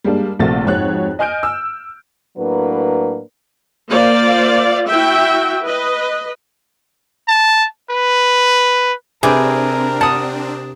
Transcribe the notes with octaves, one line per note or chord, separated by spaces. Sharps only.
G3 G#3 A#3 D4
A#1 C3 A3 A#3 F#4 A6
F2 G#2 F#4 C#5 F#6
D#5 G#5 F6 G6 D7
E6
A2 F#3 A#3 D4 B4
A#3 F4 C5 D5 F5
E4 F#4 E5 G5
B4 D#5
A5
B4
C3 C4 D4 G#4 A#4 B4 D6
F#5 A5 D#6